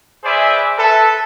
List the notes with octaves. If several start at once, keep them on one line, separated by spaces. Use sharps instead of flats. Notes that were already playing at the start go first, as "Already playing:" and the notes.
G#4 B4 C5 D5 E5 G#5
A4 B4 E5